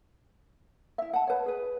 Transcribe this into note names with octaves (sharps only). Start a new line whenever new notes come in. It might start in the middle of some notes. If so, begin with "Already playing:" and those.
E4 E5
F#5 A5
B4 C#5
G#4 B4